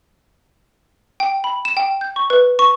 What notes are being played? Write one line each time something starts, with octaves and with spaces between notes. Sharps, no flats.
G5
B5
E7
G5
G6
C#6
B4
C#6